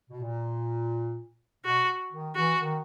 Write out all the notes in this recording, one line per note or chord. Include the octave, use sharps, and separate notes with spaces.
B2
A#2
B2 F#4
D#3
E3 F#4
D#3